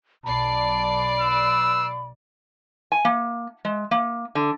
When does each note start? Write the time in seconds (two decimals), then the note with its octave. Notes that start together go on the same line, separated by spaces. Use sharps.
0.25 B1 D5 A5 B5 C7
1.20 B4 E6
2.92 G#5
3.05 A#3
3.65 G#3
3.91 A#3
4.35 D3